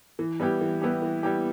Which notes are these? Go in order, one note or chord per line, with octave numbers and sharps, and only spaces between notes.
E3
G3 B3 E4 G4
E3
G3 B3 E4 G4
E3
G3 B3 E4 G4